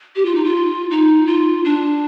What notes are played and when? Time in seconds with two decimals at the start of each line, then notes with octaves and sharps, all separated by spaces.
0.16 G4
0.25 F4
0.35 D#4
0.44 F4
0.91 D#4
1.27 F4
1.65 D4